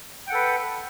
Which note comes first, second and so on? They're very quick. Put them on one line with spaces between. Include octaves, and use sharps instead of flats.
G5 F#5 A4 B4